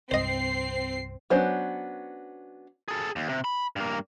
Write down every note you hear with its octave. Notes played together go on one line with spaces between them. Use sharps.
C2 G2 C4 C5 D#5 C7
F#3 B3 C#4 D4 C5
G#4 A4
D#2
C3
B5
G2 A#3